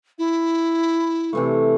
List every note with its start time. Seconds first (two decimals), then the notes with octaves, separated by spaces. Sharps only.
0.18 E4
1.33 C3 E3 A3